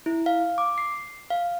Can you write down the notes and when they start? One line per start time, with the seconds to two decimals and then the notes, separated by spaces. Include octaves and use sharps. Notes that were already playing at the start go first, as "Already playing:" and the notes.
0.06 E4
0.26 F5
0.58 D6
0.78 C7
1.30 F5